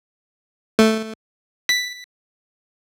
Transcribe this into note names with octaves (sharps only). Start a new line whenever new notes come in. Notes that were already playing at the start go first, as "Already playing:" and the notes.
A3
B6